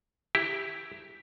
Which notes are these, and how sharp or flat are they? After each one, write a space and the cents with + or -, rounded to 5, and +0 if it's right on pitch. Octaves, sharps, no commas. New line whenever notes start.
E4 +0 G4 +0